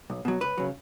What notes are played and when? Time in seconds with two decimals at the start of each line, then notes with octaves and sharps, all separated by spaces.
0.10 B1
0.25 B2 F#3
0.41 C#2 B4
0.58 C#3 F#3